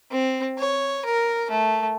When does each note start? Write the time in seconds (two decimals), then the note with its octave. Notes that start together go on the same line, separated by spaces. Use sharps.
0.11 C4
0.59 C#5
1.06 A#4
1.51 A3